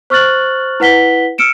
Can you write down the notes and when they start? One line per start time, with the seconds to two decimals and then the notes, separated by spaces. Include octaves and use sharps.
0.10 C5 C#6 F6 F#6 A6 F#7
0.80 E4 B4 F#5 B6 G7
1.38 E6 F6 C#7 D7 E7